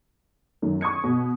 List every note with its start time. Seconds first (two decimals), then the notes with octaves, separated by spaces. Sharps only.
0.62 F#2 D#3
0.81 C#6 D#6 G#6 C#7
1.04 B2